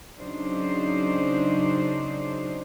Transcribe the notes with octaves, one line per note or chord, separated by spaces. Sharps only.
C#3 F#3 D4 D#4 C5